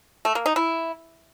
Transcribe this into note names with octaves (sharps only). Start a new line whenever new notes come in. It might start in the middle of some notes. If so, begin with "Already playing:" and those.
A3
A#3
D#4
E4